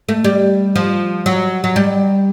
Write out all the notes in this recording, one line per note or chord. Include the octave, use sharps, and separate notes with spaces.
A3
G3
F3
F#3
F#3
G3